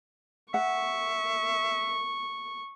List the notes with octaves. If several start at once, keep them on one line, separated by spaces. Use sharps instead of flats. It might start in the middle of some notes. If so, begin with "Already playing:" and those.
E5 F#5 C#6